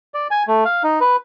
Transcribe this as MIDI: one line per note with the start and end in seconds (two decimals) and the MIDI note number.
0.14 0.28 74
0.31 0.43 80
0.48 0.64 57
0.65 0.83 77
0.84 0.99 63
1.01 1.16 71